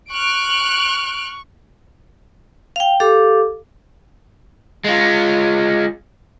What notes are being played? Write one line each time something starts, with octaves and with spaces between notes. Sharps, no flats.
C#6 F6 F#6 D7
F5 G5
G4 A4 F5 D6
G#3 F4